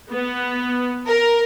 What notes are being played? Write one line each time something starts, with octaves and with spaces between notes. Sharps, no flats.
B3
A#4